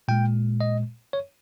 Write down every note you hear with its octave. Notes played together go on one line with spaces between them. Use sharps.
A#2 G#3 G5
D#5
C#5